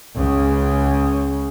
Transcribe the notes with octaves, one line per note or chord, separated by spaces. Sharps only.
C#2 C#3